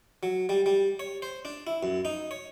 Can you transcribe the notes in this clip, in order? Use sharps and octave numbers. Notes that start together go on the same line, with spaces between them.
F#3
G3
G3
C#5
C5
D4
E4
F#2
D#4
C#5